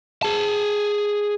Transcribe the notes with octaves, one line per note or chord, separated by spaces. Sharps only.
G#4 A5